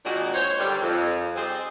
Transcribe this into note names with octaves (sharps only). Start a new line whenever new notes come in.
A#2 D#3 G#3 D4 F#4
C5 C#5
D#2 D3 G3
F2
G3 C4 D#4 G#4 C5